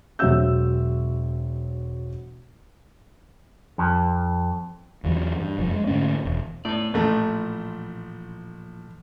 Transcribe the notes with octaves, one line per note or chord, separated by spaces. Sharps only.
E1 F#3 C4 E5 E6 G6
F2
E2 E3 F#3
G2
F1 F#2 F3
G#3
G#2 D3 A3 C#4
E1
A2 B3 D5
A1 A#2 E3 F3 A3